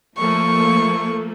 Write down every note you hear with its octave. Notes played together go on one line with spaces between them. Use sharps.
F3 A3 A#3 C#6